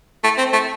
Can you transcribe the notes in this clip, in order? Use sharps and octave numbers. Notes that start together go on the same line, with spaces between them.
A3
C4
A3